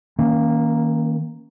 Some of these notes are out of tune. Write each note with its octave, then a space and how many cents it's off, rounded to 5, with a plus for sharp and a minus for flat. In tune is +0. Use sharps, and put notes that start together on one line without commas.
D#3 +35 A#3 +0 C#4 +0